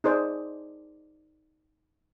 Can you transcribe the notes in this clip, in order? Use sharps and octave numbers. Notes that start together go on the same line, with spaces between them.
D#4 G#4 C5 D5